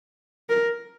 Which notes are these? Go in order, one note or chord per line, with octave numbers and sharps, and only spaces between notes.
A#4